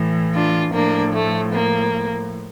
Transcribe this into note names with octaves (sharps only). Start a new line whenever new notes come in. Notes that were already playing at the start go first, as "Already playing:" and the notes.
Already playing: A2 E3
D4 F4
A2 F3 A#3 D4
A3
A#3